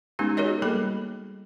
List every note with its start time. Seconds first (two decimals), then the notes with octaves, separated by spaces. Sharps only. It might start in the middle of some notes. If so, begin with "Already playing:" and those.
0.19 G#3 B3 C#4 D#4 G4
0.37 F#4 G#4 A#4 C#5 D#5
0.62 G3 A#3 G#4 A4 B5